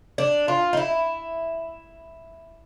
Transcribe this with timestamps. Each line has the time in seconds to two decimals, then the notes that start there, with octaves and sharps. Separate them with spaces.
0.18 D4
0.48 F4
0.73 D#4
0.77 E4